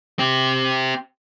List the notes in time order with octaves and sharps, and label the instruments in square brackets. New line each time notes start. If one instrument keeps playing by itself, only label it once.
[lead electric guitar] C4 G4